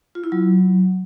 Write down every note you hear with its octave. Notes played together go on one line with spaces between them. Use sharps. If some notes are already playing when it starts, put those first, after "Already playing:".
F4
E4
F#3